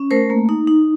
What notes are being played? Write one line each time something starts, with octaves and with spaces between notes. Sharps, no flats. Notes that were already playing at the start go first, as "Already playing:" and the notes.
Already playing: C#4
A3 A#4 C5
A#3
D#4
D#4